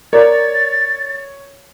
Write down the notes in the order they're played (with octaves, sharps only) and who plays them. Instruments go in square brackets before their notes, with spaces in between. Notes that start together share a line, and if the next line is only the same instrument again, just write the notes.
[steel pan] A#4 D5 [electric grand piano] C#5 G#6 [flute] A6